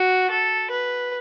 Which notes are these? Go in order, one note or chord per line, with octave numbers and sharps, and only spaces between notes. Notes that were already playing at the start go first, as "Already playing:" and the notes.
Already playing: F#4
A4
B4